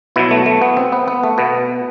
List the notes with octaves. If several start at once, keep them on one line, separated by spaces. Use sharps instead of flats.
B2 F#3 E4
A3
A3
B3
C4
B3
B3
A3
B2 B3